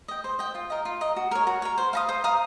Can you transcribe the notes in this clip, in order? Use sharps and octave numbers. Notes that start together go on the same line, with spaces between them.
D#5 G5
C5
D#5 G5
F4
A#4 D#5
F4
A#4 D#5
F#4
A#4 C#5
F#4
A#4 C#5
C5
F5 A#5 D#6
C5
F5 A#5 D#6